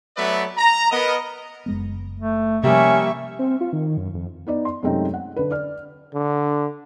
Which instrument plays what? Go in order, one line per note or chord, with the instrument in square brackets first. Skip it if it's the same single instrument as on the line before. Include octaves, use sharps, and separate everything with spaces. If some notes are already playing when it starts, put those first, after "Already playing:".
[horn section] F#3 A3 B3 B4 D5 E5
A#5
B3 A#4 D#5
[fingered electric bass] F#1 G#3 B3
[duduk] A3
[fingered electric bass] C3 F3 [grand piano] G3 A#3 [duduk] C#4 [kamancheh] E5 C#6
[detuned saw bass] C4
F4
D#3
F#2
F2
[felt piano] B3 D#4 D5
C6
F#2 C3 G#3 A3 C4 D#4
F#5
D3 B4
D5 F6
[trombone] D3